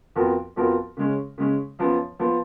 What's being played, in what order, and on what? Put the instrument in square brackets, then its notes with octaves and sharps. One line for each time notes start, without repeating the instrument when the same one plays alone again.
[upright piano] F2 F3 B3 F#4 A#4
F2 F3 B3 F#4 A#4
C#3 G#3 C#4
C#3 G#3 C#4
F#2 F3 B3
F3 B3